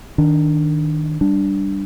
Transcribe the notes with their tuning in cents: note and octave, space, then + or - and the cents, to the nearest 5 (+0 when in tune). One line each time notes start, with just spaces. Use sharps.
D#3 +5 D4 +0
G3 +0 D4 +0